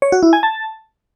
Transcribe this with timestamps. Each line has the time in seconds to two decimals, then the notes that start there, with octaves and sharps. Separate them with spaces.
0.02 C#5
0.12 F#4
0.23 E4
0.33 G#5
0.43 A5